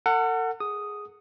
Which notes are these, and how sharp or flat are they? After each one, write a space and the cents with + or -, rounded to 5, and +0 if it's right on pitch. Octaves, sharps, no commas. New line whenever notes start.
A4 +45 F#5 +0
G#4 +0 D#6 +0